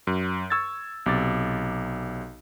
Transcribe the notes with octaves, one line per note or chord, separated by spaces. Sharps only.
F#2
C#6 E6 G#6 A6
B1 C3 D6 A6